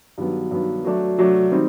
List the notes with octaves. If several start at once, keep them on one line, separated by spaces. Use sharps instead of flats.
G2 D#3 F#3 B3
G2 D#3 F#3 B3
F#3 A3 D4
F#3 A3 D4
D#3 G3 C4 D#4